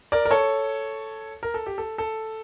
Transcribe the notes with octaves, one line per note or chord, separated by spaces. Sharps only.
A#4 D5
A#4
A4 C#5
A#4
A4
G4
A4
A4